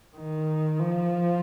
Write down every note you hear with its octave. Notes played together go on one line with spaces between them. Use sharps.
D#3
F3